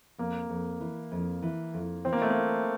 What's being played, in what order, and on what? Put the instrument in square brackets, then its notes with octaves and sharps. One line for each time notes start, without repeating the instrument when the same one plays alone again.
[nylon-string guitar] F2 [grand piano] A#3
[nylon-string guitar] F2
E3
F2
E3
F2
[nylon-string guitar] E3 [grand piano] C4
[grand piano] A#3
A3
A#3
[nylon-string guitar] E4